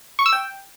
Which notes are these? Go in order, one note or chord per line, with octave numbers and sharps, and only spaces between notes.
C#6
E6
G5